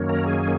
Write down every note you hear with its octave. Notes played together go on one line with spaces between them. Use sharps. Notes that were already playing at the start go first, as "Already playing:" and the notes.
Already playing: F#2 D#3 F#3 A#3 C#4
A#4
G#4